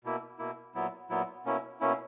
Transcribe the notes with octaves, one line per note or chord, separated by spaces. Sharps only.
B2 A#3 E4
B2 A#3 E4
A#2 F#3 B3 E4
A#2 F#3 B3 E4
B2 A#3 C#4 E4
B2 A#3 C#4 E4